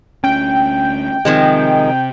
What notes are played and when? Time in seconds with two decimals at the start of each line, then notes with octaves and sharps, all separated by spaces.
0.24 D2 C#4 G5
1.25 C3 D#3 F3 G#3 C4